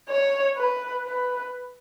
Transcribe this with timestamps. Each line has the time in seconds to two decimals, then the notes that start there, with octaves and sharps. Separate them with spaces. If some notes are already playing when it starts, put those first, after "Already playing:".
0.09 C#5
0.57 B4
1.06 B4